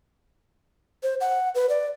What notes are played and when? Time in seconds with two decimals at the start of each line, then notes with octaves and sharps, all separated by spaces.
1.03 C5
1.21 F#5
1.55 B4
1.69 D5